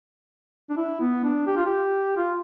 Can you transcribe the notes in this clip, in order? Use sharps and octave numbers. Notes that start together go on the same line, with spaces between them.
D4
E4
B3
D4
G4
F4
G4
F4